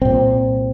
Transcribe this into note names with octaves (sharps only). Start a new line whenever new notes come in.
C2 A#2 C4